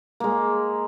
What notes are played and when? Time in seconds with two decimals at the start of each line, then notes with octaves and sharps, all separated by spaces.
0.20 G#3 A#3